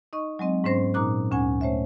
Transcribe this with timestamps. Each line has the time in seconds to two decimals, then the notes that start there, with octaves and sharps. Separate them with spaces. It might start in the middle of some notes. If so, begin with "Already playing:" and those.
0.13 D#4 D#5 C#6
0.39 F#3 G#3 C4 D#5
0.64 G#2 B3 C#4 C5 C6 A#6
0.94 A#2 D#4 A#5 D6 F#6
1.31 D2 C#4 F#5 G#5 G#6
1.61 A3 C5 C#5 E5